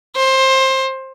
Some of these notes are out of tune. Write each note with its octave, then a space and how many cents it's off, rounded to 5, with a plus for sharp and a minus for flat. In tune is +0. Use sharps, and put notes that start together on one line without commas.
C5 +20